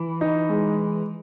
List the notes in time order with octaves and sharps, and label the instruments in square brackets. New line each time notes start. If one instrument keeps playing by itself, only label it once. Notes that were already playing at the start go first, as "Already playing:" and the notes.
Already playing: [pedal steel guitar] E3
[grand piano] D#4
G#3